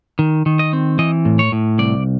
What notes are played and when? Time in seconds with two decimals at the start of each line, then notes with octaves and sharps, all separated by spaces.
0.19 D#3
0.46 D#3
0.59 D#5
0.73 C4
0.99 E3 D#5
1.25 A2
1.39 C#5
1.52 A2
1.79 C2 D5